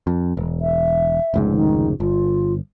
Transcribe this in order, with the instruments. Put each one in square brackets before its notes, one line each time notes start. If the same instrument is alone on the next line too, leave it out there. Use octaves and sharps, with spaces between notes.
[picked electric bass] F2
E1
[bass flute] E5
[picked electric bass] F1 C#2 G#2
[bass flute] D#3
[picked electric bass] G1 [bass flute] F4